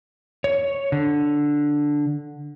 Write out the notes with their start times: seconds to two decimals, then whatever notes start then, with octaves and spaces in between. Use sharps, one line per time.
0.44 C#5
0.92 D3